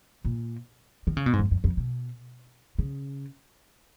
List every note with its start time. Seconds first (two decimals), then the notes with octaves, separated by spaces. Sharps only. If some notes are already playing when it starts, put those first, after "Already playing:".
0.25 A#2
1.07 D#3
1.17 C#3
1.26 B2
1.33 G#2
1.39 F#2
1.51 F#2
1.64 F2
1.77 B2
2.79 C#3